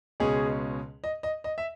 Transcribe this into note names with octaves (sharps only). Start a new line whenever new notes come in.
C#2 B2 G#3 C#4 G#4
D#5
D#5
D#5
E5